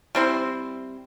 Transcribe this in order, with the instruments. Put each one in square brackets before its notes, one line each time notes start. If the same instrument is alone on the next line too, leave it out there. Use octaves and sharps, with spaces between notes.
[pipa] G3 C4 E4 C5